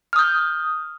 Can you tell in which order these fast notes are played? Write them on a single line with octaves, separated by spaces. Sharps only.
F6 D#6 G6